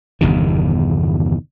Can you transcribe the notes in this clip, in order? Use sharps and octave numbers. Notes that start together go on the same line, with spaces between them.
G1 E2 C3 D#3